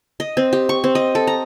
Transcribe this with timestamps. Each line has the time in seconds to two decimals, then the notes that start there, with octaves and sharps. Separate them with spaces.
0.20 D#5
0.37 C4
0.53 G4
0.69 C#6
0.84 C4
0.95 D#5
1.15 A4
1.27 A#5